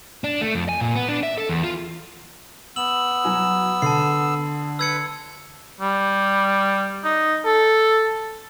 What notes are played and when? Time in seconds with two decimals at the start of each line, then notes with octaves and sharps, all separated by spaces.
0.24 D4
0.41 A3
0.55 F2
0.69 G#5
0.81 A#2
0.95 B3
1.09 D4
1.23 E5
1.38 A4
1.49 E2
1.63 F4
2.76 B3 E6 F#7
3.24 F#3 F#4 G#5
3.82 D3 A5 C7
4.79 B4 B5 E6 G#6 C#7
5.81 G3
7.04 D#4
7.45 A4